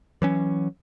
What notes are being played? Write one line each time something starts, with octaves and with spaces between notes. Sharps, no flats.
E3 F#3 C#4